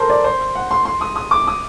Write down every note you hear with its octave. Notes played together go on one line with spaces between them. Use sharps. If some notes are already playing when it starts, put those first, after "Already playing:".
Already playing: A4 A#4 C5
D5
C5
F#5
C6
C6
D#6
D#6
D6
D#6